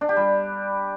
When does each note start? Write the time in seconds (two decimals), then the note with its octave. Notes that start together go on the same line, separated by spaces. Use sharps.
0.01 D4
0.09 G4
0.16 G3